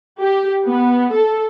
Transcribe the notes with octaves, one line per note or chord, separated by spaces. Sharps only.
G4
B3
A4